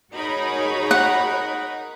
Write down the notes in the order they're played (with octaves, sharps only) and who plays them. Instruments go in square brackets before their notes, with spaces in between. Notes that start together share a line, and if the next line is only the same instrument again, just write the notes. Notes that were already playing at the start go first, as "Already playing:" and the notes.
[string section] D#4 A#4 B5 [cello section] F#4 G#4 C#5
[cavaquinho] F#5